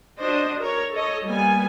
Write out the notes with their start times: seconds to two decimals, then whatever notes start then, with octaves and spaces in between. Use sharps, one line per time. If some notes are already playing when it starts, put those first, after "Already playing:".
0.20 D4 F#4 C5 D#5
0.60 A#4 C#5
0.93 A4 C#5 D#5
1.25 G3 A#3 B3 G#5